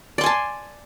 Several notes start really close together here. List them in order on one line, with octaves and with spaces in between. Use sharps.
D5 C6 G#5 A5